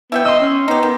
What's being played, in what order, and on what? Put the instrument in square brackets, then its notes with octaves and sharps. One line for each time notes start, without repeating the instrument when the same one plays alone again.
[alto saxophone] B3 [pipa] E4 E5 G5
[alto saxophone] D#5 [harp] C6 E6
[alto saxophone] C#4
[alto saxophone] B3 [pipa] D#4 G4
[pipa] D#3